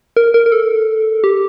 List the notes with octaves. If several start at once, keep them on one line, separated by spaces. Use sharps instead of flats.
A#4
A#4
A#4
A4
G4